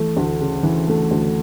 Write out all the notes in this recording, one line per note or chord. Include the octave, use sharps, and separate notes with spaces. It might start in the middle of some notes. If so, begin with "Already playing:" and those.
Already playing: E3 A3
D2
C#3
E3
A3
D2